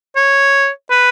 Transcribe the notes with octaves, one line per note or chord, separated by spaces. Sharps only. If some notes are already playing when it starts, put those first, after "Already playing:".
C#5
B4